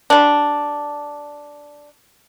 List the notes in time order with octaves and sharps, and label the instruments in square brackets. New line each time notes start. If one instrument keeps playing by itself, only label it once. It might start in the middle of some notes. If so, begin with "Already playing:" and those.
[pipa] G3 D4